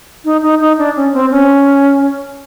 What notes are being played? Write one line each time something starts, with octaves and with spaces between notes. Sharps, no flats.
D#4
D#4
D#4
D4
C#4
C4
C#4